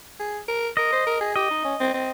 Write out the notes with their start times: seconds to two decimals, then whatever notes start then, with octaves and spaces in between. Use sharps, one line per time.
0.19 G#4
0.48 A#4
0.77 A#4 D#5
0.92 C5
1.07 A#4
1.21 G#4
1.36 G4 D#5
1.51 D#4
1.65 C#4
1.80 C4
1.94 C4